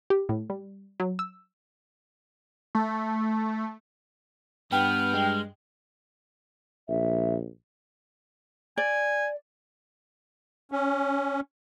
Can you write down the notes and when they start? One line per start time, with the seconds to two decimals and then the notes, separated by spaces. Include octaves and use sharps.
0.10 G4
0.29 A2
0.50 G3
1.00 F#3
1.19 E6
2.75 A3
4.72 G2 B3 G5 F6
5.14 G#3
6.88 A#1 E5
8.78 D5 G#5
10.72 C#4